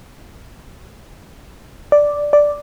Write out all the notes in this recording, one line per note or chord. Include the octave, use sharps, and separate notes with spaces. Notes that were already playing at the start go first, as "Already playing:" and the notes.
D5
D5